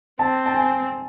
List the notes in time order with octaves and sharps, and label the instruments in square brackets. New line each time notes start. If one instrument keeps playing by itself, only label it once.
[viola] C4 [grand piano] A5
[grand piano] A5
G#5